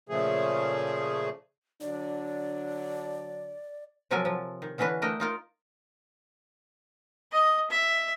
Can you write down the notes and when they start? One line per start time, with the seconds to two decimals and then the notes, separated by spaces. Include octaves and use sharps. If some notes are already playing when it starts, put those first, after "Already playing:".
0.09 A#2 C#3 F3 A3 G#4
1.81 D3 F#3 D4 D5
4.11 C3 F3 F#3 A4 A#4 G#5
4.25 F3
4.62 D#3
4.78 D3 E3 C#4 D4 B4
5.02 A3 D4 A#4 D#5 G5
5.20 D#4 F4 A#4
7.32 D#5
7.70 E5